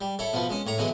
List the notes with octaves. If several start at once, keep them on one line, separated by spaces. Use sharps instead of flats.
G3
E4 A4 C#5
B2 F3 B3
G#3 C#4
A2 C#5 A#5
D3 E3 F#3 G#3 B3